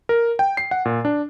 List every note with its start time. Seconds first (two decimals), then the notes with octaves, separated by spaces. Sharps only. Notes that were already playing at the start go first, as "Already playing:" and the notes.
0.09 A#4
0.39 G5
0.57 C7
0.71 F#5
0.85 A#2
1.05 D4